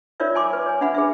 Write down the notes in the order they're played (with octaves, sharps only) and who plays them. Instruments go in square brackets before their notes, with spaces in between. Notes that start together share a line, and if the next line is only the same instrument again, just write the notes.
[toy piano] D#4 F4 A#4 C#5 D5 E5
G#5 A5 C6 D6
B4
C#5 G#5
D4 E5 F#5 B5
G#4 B4 E5